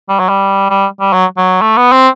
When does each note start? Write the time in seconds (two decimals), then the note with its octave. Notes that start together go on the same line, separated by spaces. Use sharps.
0.09 G3
0.19 F#3
0.29 G3
0.70 G3
1.00 G3
1.13 F#3
1.37 F#3
1.61 A3
1.77 B3
1.92 C4